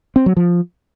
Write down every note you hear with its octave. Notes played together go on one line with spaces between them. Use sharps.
C4
F#3
F3